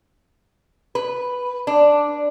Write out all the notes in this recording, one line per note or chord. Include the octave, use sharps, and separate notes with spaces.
B4
D4